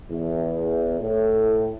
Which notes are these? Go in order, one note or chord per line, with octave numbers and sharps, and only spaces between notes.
E2
A2